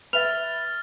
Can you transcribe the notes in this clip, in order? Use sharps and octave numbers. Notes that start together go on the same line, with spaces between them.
B4 E5 F6 A6 F7